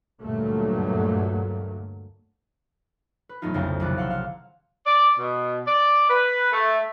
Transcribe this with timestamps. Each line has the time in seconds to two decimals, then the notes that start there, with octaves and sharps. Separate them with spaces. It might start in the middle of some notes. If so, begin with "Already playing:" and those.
0.22 D2 G2 A#2 F#3 A3 A#3
3.29 B4
3.42 E1 F#3 A3 B3 D#4 F4
3.54 B1 F2 C#3 E4 C5 F5
3.80 A#1 C3 D#3 E4 D6 F#6
3.97 F5 F#5 C6 E6
4.10 F5
4.86 D5
5.18 B2
5.67 D5
6.09 B4
6.52 A3